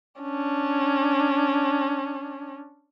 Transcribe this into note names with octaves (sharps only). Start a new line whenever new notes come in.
C#4 D4